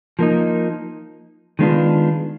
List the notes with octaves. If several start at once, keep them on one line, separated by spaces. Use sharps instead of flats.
F3 A#3 D#4
D#3 G#3 B3 D4 F4